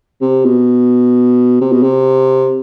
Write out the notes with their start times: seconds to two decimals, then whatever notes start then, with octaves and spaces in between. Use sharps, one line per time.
0.21 C3
0.45 B2
1.61 C3
1.72 B2
1.82 C3